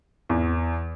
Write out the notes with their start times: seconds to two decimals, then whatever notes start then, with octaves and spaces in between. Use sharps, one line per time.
0.29 E2